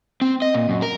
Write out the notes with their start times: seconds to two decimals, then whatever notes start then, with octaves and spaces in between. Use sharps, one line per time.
0.21 C4
0.42 D#5
0.54 A#2
0.69 F#2
0.82 A#4